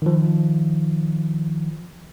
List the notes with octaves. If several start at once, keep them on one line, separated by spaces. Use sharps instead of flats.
D#3 F3